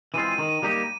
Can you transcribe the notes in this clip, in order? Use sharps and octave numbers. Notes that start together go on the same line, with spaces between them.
E3 G#3 C4 F4 D#7
D#7
D#3
D#7
G3 A#3 D#4 G4 D#7